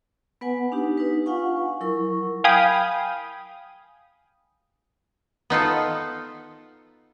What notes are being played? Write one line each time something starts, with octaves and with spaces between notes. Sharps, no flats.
B3 B4 F#5 G#5
D4 D#4 G4
D#4 B4
F4 F5 F#5 G#5 C#6
F#3 E4 A#4 C#6
F5 G5 G#5 B5 D#6
B3 D#4 F4 A4